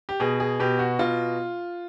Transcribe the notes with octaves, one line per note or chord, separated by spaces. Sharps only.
G4
B2 G#4
G#4
B2 G4
F#4
B2 F4